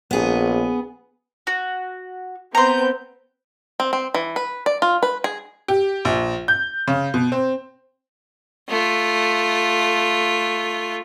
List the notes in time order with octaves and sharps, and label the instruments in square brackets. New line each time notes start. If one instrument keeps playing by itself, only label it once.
[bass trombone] A#1 [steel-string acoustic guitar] B3 G#4
[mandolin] F#4
[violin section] B3 C4 G6 [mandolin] A#5 C6
[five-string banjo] C4
C4
E3
B4
D5
F4
B4
G#4
[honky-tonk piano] G4
A#1
G6
C#3
B2
C4
[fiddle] A3 F4